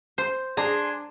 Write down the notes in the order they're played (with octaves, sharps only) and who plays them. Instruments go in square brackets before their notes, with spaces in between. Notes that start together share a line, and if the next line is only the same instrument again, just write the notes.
[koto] C5
[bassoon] D4 [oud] G#4 [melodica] G#5 C6 [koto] A#5